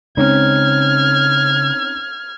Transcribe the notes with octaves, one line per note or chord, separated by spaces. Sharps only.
C#3 G#3 C4 C#4 D#4 F6 G#6